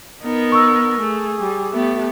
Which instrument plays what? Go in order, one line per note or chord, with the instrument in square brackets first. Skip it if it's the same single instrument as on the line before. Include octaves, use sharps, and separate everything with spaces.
[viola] B3 A#4 [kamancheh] D#4
[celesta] C#6 E6
[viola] A3 [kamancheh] G#4
[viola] G3
[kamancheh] A3 G4 [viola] B3